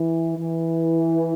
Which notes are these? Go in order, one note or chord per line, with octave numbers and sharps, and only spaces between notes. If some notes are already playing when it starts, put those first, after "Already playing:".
Already playing: E3
E3